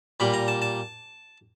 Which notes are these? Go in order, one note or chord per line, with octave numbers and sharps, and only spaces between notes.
A#2 G3 A#3 B5
A#5
A5
A5